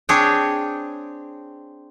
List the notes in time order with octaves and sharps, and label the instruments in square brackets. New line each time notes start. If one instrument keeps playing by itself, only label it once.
[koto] C4 D4 G#4 C#5 G5